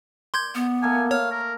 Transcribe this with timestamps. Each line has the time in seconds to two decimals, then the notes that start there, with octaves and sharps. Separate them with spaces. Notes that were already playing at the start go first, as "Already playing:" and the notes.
0.34 D5 C6 G6 G#6
0.55 B3
0.82 A3 A#3 G#5
1.11 C#5 F5
1.31 A#4